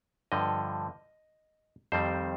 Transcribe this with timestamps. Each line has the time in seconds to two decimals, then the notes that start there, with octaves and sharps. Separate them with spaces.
0.32 G2 D3 F3 D#5
1.92 F2 D#3 G3 C4 C5